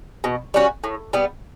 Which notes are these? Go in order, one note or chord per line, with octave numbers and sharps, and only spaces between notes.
B2
G3 C#4 F#4
A2
G3 B3